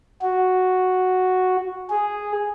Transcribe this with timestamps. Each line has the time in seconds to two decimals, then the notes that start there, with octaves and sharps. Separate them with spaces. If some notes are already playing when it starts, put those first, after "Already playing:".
0.22 F#4
1.90 G#4